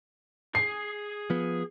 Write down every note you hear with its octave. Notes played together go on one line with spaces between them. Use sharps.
G#4 G#5 C7
F3 B3